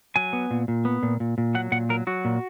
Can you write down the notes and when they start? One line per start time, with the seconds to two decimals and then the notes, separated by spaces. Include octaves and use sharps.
0.16 F#3 G#5
0.33 B3
0.51 A#2
0.68 A#2
0.85 B3
1.03 A#2
1.20 A#2
1.38 A#2
1.55 F#3 F#5
1.72 A#2 F#5
1.89 F#3 A#4
2.07 F#3 F#4
2.25 A#2